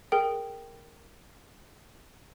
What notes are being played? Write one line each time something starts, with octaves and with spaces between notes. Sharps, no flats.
G#4 A#4 G5